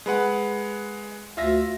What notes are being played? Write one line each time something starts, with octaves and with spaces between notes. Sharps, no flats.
G#3 B4 F#5
D2 F4 E5 A#6